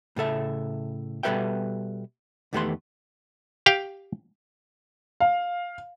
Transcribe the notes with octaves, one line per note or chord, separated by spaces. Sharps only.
A2 C#3 A4 E5
B2 G3 A4 B4 E5 G5
E2 D#3 A3 G4 B4 C6
G4 F5 G5
F5